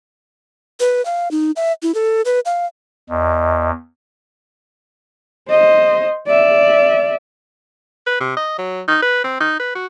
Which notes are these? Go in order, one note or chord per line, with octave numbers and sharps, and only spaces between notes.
B4
F5
D#4
E5
E4
A4
B4
F5
E2 D#5
C5 D#5
D5 E5
B4
C3
D#5
F#3
D#4
B4
C4
D#4
B4
F#4